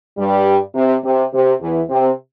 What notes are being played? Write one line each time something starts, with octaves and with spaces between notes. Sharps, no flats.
G2 G3
C3
C3
C3
E2 E3
C3 C4